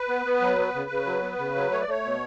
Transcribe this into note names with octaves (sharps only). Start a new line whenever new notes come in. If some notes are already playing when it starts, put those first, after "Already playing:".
Already playing: B4
B3
B3
F#3
B3
C#3
C#3
F#3
B3
C#3
F#3
A3 C#5
D5
A3 C#5
B2